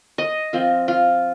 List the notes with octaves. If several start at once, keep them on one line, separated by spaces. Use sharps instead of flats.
D#5
F3 C4 F4
F4